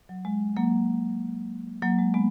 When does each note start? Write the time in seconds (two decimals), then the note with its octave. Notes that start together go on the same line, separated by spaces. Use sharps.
0.09 F#3
0.25 G#3
0.57 F#3 A#3
1.82 F#3 A#3
1.99 G#3
2.14 G#3 B3